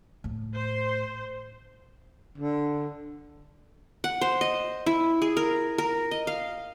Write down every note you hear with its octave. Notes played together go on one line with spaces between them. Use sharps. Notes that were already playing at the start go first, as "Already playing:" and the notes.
A2
C5
D3
F#5
C5
D#5
E4
G#4
A#4
A#4
D#5
F5